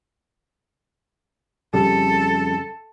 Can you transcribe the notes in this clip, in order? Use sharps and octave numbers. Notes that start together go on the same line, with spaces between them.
F2 C#3 G3 A4